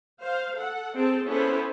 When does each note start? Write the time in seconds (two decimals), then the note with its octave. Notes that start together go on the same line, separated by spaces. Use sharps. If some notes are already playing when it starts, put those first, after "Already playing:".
0.20 C5 F5
0.56 A4 F#5
0.94 C4 G#4 A4 A5
1.25 B3 C#4 E4 A4 B4 C5